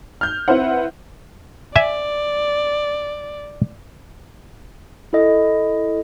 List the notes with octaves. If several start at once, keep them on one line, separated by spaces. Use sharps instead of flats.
F6 G6
C4 E4 B4 C5 F#5
D5 E5 G#5
E4 A4 D#5